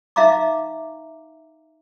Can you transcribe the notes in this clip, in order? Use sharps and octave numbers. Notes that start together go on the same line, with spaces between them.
D#4 E5 F5 A#5 D6